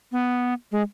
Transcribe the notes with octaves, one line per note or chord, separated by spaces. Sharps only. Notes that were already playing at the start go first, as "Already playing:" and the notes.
B3
G#3